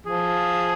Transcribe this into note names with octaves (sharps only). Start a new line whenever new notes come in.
F3 G#4